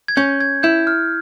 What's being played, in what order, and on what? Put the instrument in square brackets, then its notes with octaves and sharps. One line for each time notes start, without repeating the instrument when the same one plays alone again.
[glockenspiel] G#6
[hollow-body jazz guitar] C#4 [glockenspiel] G6
[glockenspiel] G#6
[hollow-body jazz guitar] E4 [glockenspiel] G6
[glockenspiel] F6